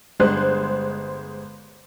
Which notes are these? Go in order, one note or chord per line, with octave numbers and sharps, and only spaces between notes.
G1 G#3 C5 F#6